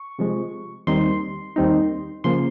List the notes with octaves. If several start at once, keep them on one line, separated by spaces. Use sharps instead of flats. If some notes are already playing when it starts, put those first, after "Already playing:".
Already playing: C#6
C3 F3 G#3
D#2 D#3 G3 C4 D#4 C6
D#2 D#3 G3 C4 D#4
C#3 F3 A#3 C6